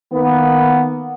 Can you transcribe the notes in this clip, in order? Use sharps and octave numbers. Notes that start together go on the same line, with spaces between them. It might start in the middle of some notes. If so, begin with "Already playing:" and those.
D#3 A#3 B3